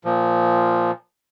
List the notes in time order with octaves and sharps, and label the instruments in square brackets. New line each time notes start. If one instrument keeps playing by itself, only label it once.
[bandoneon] A#2 F3